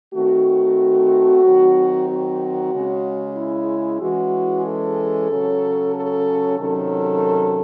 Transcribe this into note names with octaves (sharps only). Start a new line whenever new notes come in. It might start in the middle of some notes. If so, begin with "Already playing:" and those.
D#3 A3 C4 F#4
D#3 F#3 C4
F#4
C#3 G#3 C#4
E4
E3 G#3 C#4 F#4
A4
C#3 F#3 C#4
A4
C3 D#3 F#3 C#4 A4